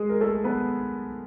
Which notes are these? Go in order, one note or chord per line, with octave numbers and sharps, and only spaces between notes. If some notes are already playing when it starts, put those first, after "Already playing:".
Already playing: G#3 G#4
A#4
A3 A4
B3 B4